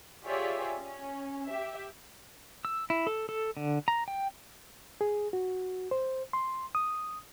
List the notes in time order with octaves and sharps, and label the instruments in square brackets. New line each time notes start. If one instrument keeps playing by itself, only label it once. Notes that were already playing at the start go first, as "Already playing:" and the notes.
[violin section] F4 G4 G#4 C#5 D5 E5
C#4
G4 E5
[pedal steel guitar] E6
E4
A4
A4
D3
A#5
G5
[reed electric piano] G#4
F#4
C5
C6
D#6